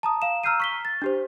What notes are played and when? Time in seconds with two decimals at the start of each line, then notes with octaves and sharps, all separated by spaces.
0.03 A5 A#5 D#6
0.22 F5 E7
0.43 A#5 E6 F6 G6 C7 D#7
0.60 C#6 B6 G7
0.85 A6
1.02 D4 G4 C5